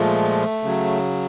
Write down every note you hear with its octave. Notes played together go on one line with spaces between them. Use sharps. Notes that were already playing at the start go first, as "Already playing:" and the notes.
Already playing: A#2 F3 G#3 A3
C#3 F#3